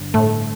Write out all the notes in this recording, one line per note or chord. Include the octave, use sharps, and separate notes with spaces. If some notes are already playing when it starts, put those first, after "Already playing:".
Already playing: G1
A2 A3